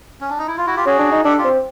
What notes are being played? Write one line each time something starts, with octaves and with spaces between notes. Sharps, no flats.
C#4
D4
D#4
E4
F4
E4 F#4
F4 G4
C#4 F#4 G#4
D4
D#4
D4 G4 A4
F4 G4
C4